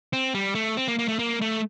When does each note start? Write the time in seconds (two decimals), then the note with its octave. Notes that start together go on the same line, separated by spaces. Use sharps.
0.13 C4
0.35 G3
0.55 A3
0.77 C4
0.88 A#3
0.99 A#3
1.08 A3
1.19 A#3
1.41 A3